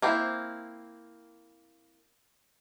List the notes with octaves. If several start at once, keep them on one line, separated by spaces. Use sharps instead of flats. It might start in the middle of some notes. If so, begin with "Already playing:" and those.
A#3 C4 E4